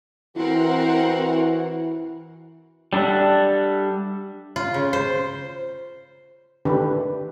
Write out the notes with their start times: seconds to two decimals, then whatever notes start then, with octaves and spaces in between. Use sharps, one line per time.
0.36 E3 C4 E4 F#4 A#4 F#5
2.93 G3 D4 A4 E5 F#5
4.56 F4
4.74 C#3
4.93 C5
6.65 D3 D#3 D4 E4 G4 B4